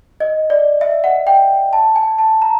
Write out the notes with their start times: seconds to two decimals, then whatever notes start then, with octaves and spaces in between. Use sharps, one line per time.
0.20 D#5
0.50 D5
0.81 E5
1.04 F#5
1.27 G5
1.73 A5
1.96 G#5
2.18 A5
2.42 A#5